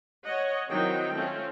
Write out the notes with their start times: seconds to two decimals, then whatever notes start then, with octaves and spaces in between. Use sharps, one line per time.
0.25 C#5 D#5 F#5
0.70 D#3 F#3 C4 D#4 E4 G5
1.14 A3 C4 C#4 F4